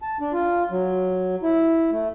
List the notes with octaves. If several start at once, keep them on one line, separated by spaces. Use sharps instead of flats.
A5
D4
F4
F#3
E4
A3